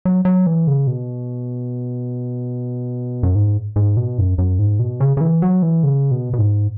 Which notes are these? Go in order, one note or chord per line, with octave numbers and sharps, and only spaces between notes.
F#3
F#3
E3
C#3
B2
F#2
G#2
G#2
B2
F#2
F#2
G#2
B2
C#3
C#3
E3
F#3
E3
C#3
B2
B2
G#2